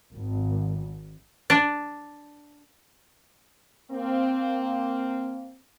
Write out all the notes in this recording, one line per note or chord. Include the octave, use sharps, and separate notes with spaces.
G#1
D4
A#3 C4